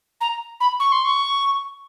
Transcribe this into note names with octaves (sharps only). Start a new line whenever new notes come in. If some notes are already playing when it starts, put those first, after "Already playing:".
A#5
B5
C#6
C6
C#6